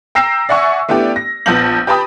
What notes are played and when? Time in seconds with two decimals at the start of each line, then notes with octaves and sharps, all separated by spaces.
0.15 G5 A#5 E6 A#6 C7 E7
0.49 D5 E5 F#5 G#5 C#6
0.89 A3 B3 D4 E4 G4 D5
1.16 A#6
1.46 A#1 B3 A5 G6 A#6 F#7
1.87 G4 B4 G5 A5 B5 D#6